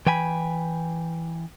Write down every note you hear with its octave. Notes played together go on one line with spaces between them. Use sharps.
E3 G5 G#5 B5